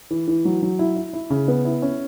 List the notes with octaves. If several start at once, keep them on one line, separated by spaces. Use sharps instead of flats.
E3
E3
F#3
F#3
E4
E4
E4
C#3
B3
E4
C#4